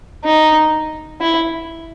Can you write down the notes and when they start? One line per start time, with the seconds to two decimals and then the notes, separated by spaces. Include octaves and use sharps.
0.24 D#4
1.21 E4